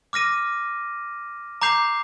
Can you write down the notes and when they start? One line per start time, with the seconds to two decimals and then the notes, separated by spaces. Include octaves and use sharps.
0.13 D6 F6 A#6 D#7
1.62 A#5 D6 G6 C7 F7